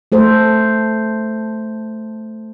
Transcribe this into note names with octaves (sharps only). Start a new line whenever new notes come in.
A3 A4 C5